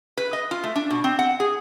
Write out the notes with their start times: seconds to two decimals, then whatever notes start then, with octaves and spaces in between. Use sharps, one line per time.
0.17 B4
0.33 D#5
0.51 F4
0.64 A3
0.76 D4
0.90 B2
1.04 C4
1.19 F#5
1.40 G#4